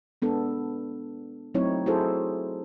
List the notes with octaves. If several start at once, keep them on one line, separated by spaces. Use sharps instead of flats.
G#3 B3 D4 A4
F#3 A3 C4 D#4 E4 C#5
E4 F#4 G#4 A4 C5